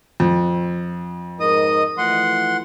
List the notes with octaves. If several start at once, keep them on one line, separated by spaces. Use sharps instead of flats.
F2
G#2 D#4 A#4 D#5 D#6
E3 F3 A3 F#5 C6